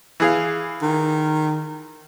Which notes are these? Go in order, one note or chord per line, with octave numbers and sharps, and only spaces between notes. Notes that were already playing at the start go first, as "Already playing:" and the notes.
E3 G#4 F5
D#3